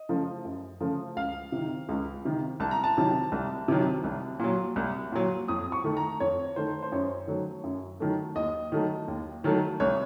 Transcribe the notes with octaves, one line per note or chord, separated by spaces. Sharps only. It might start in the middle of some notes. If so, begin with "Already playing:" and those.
Already playing: D#5
C#3 F3 A3
F#2
C#3 F3 A3
C#2 F5
C3
D#3
C#2
C3 D#3
C2 A5
A#5
A5
C3 D#3 F#3
C2
C3 D#3 F#3
C2
A#2 F#3
C2
A#2 F#3
F2 D#6
C#6
D#3 A3
A#5
F2 C#5
D#3 A3 C5
C5
F#2 C#5
D#3 F#3 A3
F#2
D#3 F#3 A3
D#2 D#5
D#3 F#3 A3
D#2
D#3 F#3 A3
C2 C#5